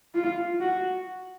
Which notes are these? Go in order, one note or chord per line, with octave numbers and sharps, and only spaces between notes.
F4
F#4